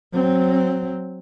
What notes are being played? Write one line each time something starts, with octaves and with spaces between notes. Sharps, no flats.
F#3 C4